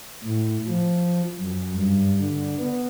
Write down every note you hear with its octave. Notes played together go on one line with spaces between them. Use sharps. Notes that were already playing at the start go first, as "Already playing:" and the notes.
A2
F3
F#2
G2
D3
B3